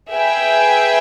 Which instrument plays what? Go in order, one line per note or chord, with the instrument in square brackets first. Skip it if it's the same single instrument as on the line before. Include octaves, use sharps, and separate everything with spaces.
[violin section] G#4 B4 E5 G5